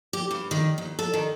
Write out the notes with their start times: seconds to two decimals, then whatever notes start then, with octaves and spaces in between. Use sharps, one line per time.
0.13 G4
0.31 G2
0.51 D#3
0.78 D#2
0.99 A4
1.13 D#3